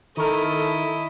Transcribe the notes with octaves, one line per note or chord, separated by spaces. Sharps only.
D#3 E4 A4 A#4 D#5